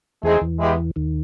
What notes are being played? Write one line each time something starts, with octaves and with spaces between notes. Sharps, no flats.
E2 E3 A3 C4 D#4 G#4
E2 E3
G#3 B3 E4 G4
D#2 D#3